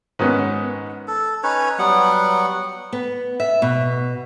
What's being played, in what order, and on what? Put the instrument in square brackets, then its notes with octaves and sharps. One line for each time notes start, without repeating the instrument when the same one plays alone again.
[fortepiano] G#2 D#3 B3 C#4
[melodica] A4
C#4 D#4 B4 C#5
F#3 G3 B3 F#5
[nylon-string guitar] B3
E5
B2